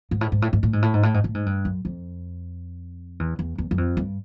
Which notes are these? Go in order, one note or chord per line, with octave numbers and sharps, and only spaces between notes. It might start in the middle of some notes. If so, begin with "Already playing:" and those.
G#2
A2
G#2
A2
G#2
A2
G#2
A2
G#2
A2
G#2
A2
G#2
G2
F#2
F2
E2
E2
E2
F#2
F2
G2